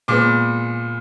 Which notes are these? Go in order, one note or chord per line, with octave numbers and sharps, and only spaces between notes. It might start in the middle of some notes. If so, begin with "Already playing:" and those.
A#2 G#3 B3 D6